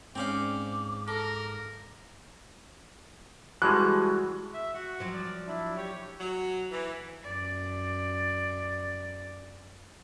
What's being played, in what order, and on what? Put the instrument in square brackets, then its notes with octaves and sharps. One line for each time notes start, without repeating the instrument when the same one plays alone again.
[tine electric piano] G#2 G#4 F5 [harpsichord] C4 C#4 D5 [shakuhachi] D6
[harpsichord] A4 [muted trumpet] A#4
[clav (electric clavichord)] E3 G3 G#3 [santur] F#4 A5 [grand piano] F#6
[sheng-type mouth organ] E5
F#4 F#5
[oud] F3 F#3
[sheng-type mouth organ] D5
D4 E4
G4 C#5
[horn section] F#3
E3
[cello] F#2 D5